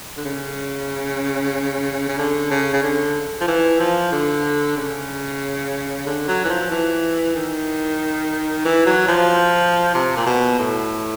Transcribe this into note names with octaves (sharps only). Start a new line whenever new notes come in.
D3
C#3
C#3
D3
C#3
C#3
D3
F3
E3
F3
D3
C#3
D3
F#3
E3
F3
E3
D#3
E3
F#3
F3
C3
A#2
B2
A2